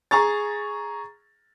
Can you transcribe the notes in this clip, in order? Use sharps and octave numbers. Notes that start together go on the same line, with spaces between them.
G#4 A#5 C#6 A6